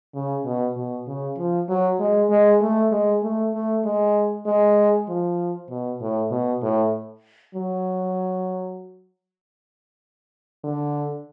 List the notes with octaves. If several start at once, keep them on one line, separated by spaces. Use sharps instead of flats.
C#3
B2
B2
C#3
F3
F#3
G#3
G#3
A3
G#3
A3
A3
G#3
G#3
F3
B2
A2
B2
A2
F#3
D3